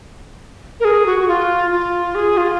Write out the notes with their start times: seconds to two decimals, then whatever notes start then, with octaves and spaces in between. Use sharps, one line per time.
0.80 A#4
0.85 G#4
1.06 F#4
1.19 F#4
1.28 F4
1.71 F4
2.15 G#4
2.37 F4